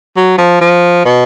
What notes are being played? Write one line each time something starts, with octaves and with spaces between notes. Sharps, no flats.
F#3
F3
F3
B2